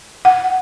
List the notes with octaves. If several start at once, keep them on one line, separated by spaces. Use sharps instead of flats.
F#5